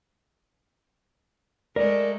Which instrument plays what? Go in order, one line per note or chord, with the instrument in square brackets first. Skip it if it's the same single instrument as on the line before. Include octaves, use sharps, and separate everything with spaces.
[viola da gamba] G#3 A3 [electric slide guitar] A#4 [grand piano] D5